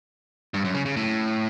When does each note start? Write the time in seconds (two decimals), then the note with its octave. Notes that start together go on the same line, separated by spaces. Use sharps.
0.54 G2
0.65 F#2
0.75 C#3
0.86 C#3
0.97 A2